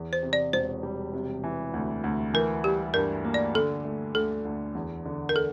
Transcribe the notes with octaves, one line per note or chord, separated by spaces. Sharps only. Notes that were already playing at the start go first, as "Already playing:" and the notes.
Already playing: E2
C5
C3
D5
E1 C5
G3
C3
E3
D2
D2
E3 A#4
G3 G4
G2 A#4
A#3
D5
D3 A4
A3
D2 A4
D2
E2
D3
A#4
A4